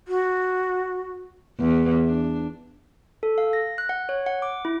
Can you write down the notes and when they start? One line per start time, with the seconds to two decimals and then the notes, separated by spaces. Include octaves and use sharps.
0.08 F#4
1.60 E2
2.06 D4
3.23 A4
3.38 F5
3.53 A#6
3.78 F#6
3.89 F#5
4.09 C#5
4.26 F#5
4.42 D6
4.65 E4